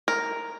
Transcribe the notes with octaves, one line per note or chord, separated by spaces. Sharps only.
A#4